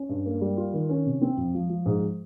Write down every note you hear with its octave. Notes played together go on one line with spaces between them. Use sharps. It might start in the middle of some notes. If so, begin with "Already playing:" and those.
Already playing: C#4
G2
A#3
G3
F4
D#3
C#4
C3
C4
F2
F3
F3
G#2